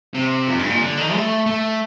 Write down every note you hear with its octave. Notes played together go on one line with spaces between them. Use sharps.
C3
F2
G2
A#2
D3
D#3
A3
A3